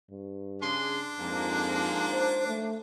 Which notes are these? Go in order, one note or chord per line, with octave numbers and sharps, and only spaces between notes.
G2
C#3 D4 G#4 C6
F2 G#2 F3 A#3
C5
A3